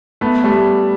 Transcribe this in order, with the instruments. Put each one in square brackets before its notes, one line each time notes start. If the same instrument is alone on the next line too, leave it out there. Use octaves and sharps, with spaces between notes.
[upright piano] A3 [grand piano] B3
[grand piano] G3 [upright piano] A3